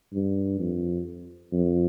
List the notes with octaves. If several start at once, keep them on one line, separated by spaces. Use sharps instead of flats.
G2
F2
F2